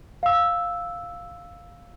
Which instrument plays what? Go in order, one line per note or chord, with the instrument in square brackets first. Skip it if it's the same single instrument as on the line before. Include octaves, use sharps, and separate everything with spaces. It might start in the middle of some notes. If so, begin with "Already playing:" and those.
[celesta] F5 E6